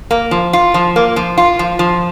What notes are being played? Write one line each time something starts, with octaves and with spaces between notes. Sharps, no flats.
A#3
F3
F4
F3
A#3
F3
F4
F3
F3